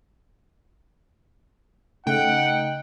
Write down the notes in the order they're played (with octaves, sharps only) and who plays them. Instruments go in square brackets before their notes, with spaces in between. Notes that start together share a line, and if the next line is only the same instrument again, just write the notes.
[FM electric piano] C#3 A3 [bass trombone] D#4 [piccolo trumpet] F#5 [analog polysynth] G5